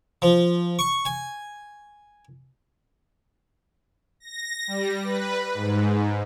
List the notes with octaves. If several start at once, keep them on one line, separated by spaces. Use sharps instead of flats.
F3
C#6
G#5
A#6
G3
B4
G#2